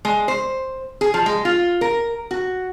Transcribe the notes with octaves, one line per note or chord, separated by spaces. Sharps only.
G#3
C5
G#4
F3
G#3
F4
A#4
F#4